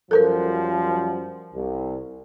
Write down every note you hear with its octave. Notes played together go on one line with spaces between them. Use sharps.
F#2 F3 G3 A4 A#4 C5
C2